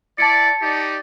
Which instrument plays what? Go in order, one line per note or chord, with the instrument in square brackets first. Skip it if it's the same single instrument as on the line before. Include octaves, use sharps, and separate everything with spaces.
[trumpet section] E4 D5 [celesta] A5 A6 C#7
[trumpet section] D#4 G4 D5